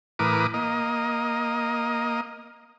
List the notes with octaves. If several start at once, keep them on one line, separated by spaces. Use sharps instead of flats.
A2 E3 A#4 B4 D6 D#6
A#3 D#5